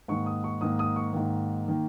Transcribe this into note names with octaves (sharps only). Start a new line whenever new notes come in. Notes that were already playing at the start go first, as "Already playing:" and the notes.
G#2 D#3 A#3 C#6
D#6
C#6
G#2 D#3 A#3 D#6
D#6
C#6
G#2 D#3 A#3
D#3 A#3